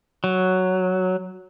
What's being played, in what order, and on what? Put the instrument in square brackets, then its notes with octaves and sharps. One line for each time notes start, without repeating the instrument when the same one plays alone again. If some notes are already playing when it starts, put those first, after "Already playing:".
[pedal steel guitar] F#3